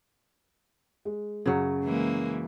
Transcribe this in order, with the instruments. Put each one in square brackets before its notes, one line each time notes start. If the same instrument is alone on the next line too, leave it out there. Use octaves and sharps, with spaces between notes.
[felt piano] G#3
[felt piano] F#2 [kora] C#3 F#3
[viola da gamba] E3 G#3 A#3